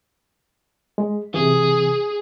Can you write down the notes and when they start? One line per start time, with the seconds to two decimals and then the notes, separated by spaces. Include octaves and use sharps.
0.98 G#3
1.34 C3 E3 G#4